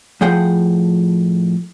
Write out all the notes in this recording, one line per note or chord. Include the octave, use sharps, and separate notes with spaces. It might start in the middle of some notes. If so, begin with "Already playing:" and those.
A2 F3 G#4 F#5 G5